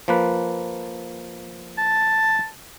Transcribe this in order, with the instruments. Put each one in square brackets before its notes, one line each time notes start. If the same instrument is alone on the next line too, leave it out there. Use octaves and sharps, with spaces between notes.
[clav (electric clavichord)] F3 A#3 B4
[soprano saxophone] A5